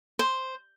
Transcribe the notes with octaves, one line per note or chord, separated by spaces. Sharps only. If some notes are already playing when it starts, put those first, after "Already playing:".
C5